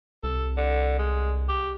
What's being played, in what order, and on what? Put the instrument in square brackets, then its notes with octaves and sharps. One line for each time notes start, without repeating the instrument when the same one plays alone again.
[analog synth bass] C2 [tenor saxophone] A4
[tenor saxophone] D3
G#3
G4